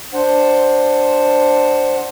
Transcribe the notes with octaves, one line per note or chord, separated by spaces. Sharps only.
D4 C5 F#5